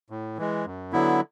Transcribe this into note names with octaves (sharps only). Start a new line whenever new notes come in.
A2
E3 G#3
F#2
D3 F#3 B3 E4